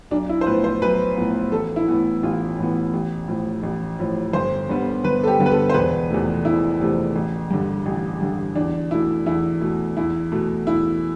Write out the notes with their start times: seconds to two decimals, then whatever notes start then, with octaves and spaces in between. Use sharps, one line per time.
0.11 B1 D4
0.29 E4
0.41 C5
0.46 A2 F3 B3 B4
0.64 C5
0.81 B1 B4
1.17 A2 F3 B3
1.52 A1 A4
1.76 E4
1.88 A2 E3 B3
2.23 A1 F4
2.58 A2 E3 B3
2.93 A1
3.28 A2 F3
3.63 A1
3.99 A2 F3
4.33 G1 C5
4.69 G2 D3 G3 B3
5.04 G1 B4
5.23 A4
5.27 G4
5.39 G2 D3 G3 B3
5.46 B4
5.51 A4
5.69 C5
5.74 E1 B4
6.10 E2 C3 F3 A3
6.45 E1 E4
6.80 E2 C3 F3 A3
7.15 A1
7.51 G2 D3
7.86 A1
8.21 G2 D3
8.56 E2 D4
8.91 B2 A3 E4
9.26 E2 E4
9.61 B2 A3
9.97 E2 E4
10.32 B2 A3
10.67 E2 E4